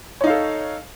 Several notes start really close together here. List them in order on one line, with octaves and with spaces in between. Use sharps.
C#5 D#4 F5 A4